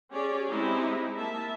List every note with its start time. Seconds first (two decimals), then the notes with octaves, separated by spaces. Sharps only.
0.12 C#4 G4 G#4 C#5 D5
0.48 G#3 C4 D#4 E4 G4
1.16 A#3 E5 A5